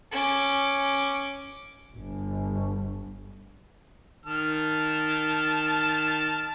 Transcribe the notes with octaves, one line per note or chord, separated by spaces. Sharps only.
C#4 D6
G1
D#3 A5 F6